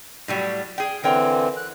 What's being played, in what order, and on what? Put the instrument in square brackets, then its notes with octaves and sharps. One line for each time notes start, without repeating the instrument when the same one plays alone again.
[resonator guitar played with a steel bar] A2 F#3 G3
G#4 G5
[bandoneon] D3 E3 C4 [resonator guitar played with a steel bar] A#4 C#5 G5
[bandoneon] F#6